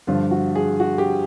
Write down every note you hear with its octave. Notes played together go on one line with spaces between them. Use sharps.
G2 D3 F3 F4
F#4
G#4
F#4
G4